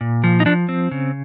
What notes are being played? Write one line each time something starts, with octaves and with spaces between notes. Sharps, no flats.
A#2
F3
D#4
F3 D4
C4
C#3